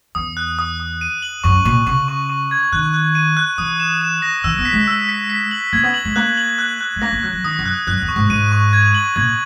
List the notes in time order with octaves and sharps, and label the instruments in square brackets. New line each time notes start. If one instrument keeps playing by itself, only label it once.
[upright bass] E2 [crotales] D#6
[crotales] F#6
D#6
D#6
D#7
F#7
[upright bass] F#2 [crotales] C#6
[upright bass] A#2 [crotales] C#6
[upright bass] C#3 [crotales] C#6
[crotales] C#6
C#6
G#6
[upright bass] D#3 [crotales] F#6
[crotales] F#6
D#7
F#6
[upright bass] E3 [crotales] D#6
[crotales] E7
E7
A#6
[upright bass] E3 [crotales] E6
[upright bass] B3
[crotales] B6
[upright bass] G#3
[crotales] E6
B6
B6
F#7
[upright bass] A#3 [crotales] G#6
[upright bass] B3
[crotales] F#7
[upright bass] G#3
[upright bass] A#3 [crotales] F#6
[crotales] F#7
F#6
F#6
[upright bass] G#3
[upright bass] A#3 [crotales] A#6
[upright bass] A#3
[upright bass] F#3 [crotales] F#6
[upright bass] F#3
[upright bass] D#3 [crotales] D#6
[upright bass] F#2
[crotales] F#6
[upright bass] F#2 [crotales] F#6
[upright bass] E2
[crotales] C#6
[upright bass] G#2
[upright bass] G#2 [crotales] D#7
[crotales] C#6
G#6
F#7
[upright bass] A#2 [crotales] G#6